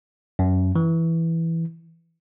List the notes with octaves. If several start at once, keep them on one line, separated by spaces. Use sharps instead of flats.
F#2
E3